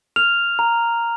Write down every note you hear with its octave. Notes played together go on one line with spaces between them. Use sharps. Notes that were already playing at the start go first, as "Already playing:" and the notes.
F6 F7
A#5